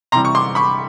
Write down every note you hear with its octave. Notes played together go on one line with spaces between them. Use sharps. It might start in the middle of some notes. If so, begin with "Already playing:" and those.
C3 E3 G3 A#5 C6
C#6
C6 D6
B5 C#6